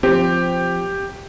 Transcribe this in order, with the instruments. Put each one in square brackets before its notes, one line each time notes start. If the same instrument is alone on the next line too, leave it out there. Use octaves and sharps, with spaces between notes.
[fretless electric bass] F3 C4 [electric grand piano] G4